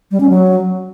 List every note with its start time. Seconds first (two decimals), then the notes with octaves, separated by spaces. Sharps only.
0.11 G3
0.20 C#4
0.29 F#3